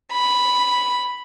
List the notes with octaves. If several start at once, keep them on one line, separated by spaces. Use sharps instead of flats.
B5